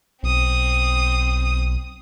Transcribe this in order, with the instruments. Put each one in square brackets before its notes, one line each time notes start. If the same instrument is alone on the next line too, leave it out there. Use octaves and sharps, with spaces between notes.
[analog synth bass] B1 [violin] C4 D#6